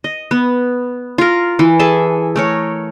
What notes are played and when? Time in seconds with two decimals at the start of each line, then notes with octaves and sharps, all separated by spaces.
0.04 D#5
0.31 B3
1.18 F4 A#4
1.59 E3
1.79 G#4 A4 E5 A5
2.36 A3 A#4 C#5